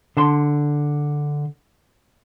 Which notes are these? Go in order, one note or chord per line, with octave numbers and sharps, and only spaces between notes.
D3 A5 C6